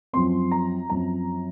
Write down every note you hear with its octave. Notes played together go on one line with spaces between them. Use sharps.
F#2 F3 C4 C6
A#5
F#2 F3 C4 A#5